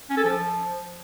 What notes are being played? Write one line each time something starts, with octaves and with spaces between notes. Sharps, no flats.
C#4
A4
F3